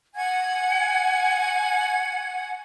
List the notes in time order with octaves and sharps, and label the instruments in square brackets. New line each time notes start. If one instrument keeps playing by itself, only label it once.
[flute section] F#5 G#5 G#6